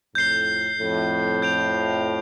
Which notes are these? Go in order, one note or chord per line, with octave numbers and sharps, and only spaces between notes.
F2 A2 G6 C7 G7
F2 A2
G6 D7 F7